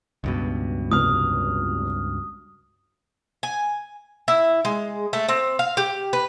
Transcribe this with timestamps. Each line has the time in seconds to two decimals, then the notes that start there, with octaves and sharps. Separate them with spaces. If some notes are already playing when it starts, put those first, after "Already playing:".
0.24 C#2 G2 B2
0.92 F1 D#6 F6
3.43 G#5
4.28 E4
4.65 G#3
5.13 A3
5.29 C4
5.59 F5
5.77 G4
6.13 B4